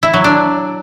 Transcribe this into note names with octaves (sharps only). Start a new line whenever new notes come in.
E4
F#3
D4